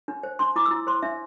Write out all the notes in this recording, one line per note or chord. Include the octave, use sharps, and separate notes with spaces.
D4
C5
D4 C6
E4 D6
E6
E4
C5 C6
D4 E5